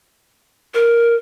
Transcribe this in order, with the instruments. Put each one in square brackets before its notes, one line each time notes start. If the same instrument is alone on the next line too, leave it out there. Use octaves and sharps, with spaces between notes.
[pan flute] A#4